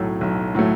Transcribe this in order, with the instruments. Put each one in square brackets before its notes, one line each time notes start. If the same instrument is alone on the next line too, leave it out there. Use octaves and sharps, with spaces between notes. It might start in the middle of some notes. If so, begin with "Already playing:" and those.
Already playing: [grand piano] B1 A2 F#3 A3
B1
A2 F#3 A3